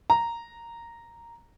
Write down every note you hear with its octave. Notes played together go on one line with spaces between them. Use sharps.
A#5